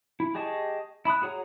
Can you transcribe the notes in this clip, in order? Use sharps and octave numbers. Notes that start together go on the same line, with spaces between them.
E4
G4 G#4 D#5 A5 C#6
E4 B5 D#6 F#6
F#4 G#4 C#5 F#5 A#5